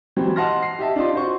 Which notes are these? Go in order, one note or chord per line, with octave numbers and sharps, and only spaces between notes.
E3 F#3 G3 C4
D#5 F#5 A5 C6 F6 A#6
C7
G4 D#5 E5 A5
D4 D#4 F4 D#5 C6
F#4 C5 C#6